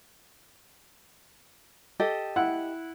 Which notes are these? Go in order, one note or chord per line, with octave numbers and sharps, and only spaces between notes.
G4 A4 D#5
E4 F#5